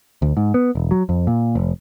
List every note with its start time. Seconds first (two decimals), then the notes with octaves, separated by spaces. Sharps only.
0.22 D2
0.37 G#2
0.54 B3
0.75 E1
0.91 F#3
1.09 F2
1.27 A#2
1.55 F1